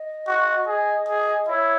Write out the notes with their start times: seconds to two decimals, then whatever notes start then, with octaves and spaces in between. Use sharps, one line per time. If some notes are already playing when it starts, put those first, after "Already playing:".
Already playing: D#5
0.27 F#4
0.67 G#4
1.08 G#4
1.48 E4 C#5